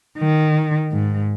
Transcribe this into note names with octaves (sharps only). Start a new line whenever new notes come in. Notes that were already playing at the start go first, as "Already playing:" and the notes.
D#3
G#2